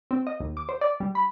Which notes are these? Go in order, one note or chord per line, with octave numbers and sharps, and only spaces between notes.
C4
D#5
D#2
D6
C5
D5
G3
B5